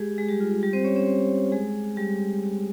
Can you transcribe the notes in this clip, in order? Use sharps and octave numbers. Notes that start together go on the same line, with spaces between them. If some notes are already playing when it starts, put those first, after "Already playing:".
Already playing: G#3 G4 G#4
G#3 G#4
G3 G4
F4
F4
G3 G4
C4 C5
C#4 C#5
C#4 C#5
C4 C5
G#3 G#4
G3 G4